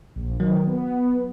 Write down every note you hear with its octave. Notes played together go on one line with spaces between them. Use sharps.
A#1
D#3 F#3
B3